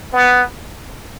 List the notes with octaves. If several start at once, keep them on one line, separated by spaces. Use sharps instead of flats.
B3